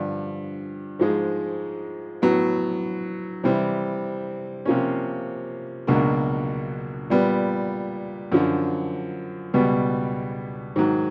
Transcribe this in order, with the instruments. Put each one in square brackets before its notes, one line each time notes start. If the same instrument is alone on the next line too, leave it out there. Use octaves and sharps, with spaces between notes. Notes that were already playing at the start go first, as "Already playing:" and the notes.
Already playing: [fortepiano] G2 D3 F3
G#2 F3 G#3
A2 F#3 B3
C3 E3 G3 C4 E4
C3 F3 A#3 C#4
C#2 B2 F#3 A#3 D4
A#2 G3 B3
F#2 D3 F3
C#2 B2 G3 B3
G#2 D#3 F#3